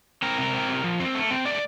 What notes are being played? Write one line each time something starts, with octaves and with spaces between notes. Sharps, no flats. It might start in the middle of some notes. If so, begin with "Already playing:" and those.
C4 A#4
C3
C4
C3
F3
C4
A3
C4
A3 D5